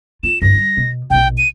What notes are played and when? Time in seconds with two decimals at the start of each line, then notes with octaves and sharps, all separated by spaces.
0.23 F4 E7
0.42 G2 E4 A#6
0.55 G3
0.77 B2
1.10 A#1 B2 G5
1.38 D#7